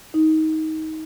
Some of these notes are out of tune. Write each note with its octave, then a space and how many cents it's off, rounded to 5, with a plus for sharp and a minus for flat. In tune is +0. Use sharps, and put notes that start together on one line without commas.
D#4 +20